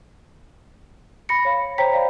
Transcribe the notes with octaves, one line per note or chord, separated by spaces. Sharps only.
B5 A#6 C#7
C#5 F5
C5 C#5 G5 A#5 B6
C5 D5 F5 A#5 B5